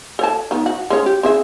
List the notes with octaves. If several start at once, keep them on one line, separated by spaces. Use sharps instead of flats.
A4 C#5 A5
D#3 B3
F#4
G#3 C#4 C#5
G4
C4 G#4 E5